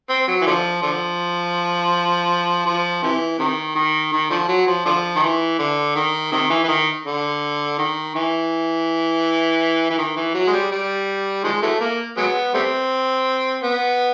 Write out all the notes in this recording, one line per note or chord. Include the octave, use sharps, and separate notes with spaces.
C4
F#3
E3
D3 F3
D3 F3
F3
C3 E3
C3 D#3
D#3
D#3
D3 F3
F#3
F3
D3 F3
D#3
E3
D3
D#3
C3 D#3
E3
E3
D#3
D3
D#3
E3
E3
D#3
E3
F#3
G#3
G3
G3
D#3 F3 G#3
E3 F#3 A3
A#3
F#3 G#3 B3
G3 A3 C4
B3